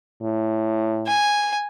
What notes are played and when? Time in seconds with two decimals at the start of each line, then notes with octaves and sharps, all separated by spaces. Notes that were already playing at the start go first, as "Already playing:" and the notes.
0.22 A2
1.07 G#5